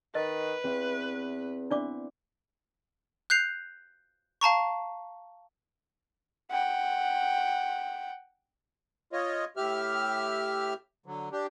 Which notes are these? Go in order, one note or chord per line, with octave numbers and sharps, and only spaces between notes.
D#3 B4 D#5
E2 C4 G4 E5
B3 D4 E4 C5 D5 D6
F#6 G6 C7 F7
F5 A5 A#5 C#6
F#5 G5
F4 C#5 D#5
A2 G4 E5 F6
D3 F#3
D4 G4